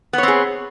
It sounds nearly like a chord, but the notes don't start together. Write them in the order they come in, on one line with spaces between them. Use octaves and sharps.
B3 C#5 C4 G#4